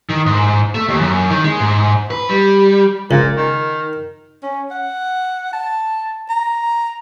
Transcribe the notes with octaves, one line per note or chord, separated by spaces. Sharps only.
D#3
G#2
A3
D#2
F#2
D#3
G#3
G#2
B4
G3
C#2 A#2
D#3
C#4
F#5
A5
A#5